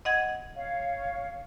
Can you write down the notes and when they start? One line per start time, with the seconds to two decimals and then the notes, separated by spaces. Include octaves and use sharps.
0.05 D#5 F#5 G#6
0.54 C#5 F5